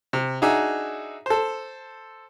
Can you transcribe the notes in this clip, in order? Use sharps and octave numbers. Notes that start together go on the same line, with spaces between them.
C3
D4 D#4 F#4 G#4 E5
A4 C5